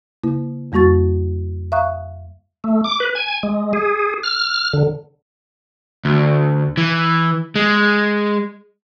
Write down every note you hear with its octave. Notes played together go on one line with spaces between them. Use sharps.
C#3 A#3 E4
F2 G3 A#3 F#4 C#6 A6
E5 F5 A#5 C#6 D#6 F#6
A3
D6
B4
G#5
G#3
G#4
F6
D3
D2
E3
G#3